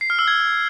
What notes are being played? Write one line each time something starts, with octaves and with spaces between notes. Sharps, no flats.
C7
F6
E6
G#6